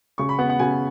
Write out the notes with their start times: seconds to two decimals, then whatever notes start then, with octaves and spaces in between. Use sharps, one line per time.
0.18 C#3 C#6
0.29 B5
0.39 B3 F#5
0.49 F#5
0.59 C#3 G#5